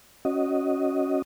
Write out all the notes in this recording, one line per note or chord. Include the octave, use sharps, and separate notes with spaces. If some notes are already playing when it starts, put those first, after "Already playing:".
C#4 F#4 D#5